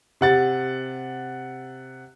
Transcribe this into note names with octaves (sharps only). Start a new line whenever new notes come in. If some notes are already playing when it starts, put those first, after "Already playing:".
C3 F#5 A6